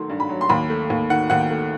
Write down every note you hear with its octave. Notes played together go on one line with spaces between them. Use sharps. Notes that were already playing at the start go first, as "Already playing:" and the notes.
Already playing: D#3 F#3 A3 C6
G2
B5
F#3
C6
D#2 B5
A3
D#2
D#3 F#5
D#2 F#5
G5
A3